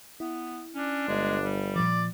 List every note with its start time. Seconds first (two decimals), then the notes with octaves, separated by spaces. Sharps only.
0.20 B3 E4
0.74 C#4 D4
1.08 G1 G#3
1.44 G3
1.76 A#2 F3 D5